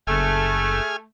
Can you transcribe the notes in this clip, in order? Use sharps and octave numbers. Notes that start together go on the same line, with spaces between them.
F#1 A3 G#4 G#5 F6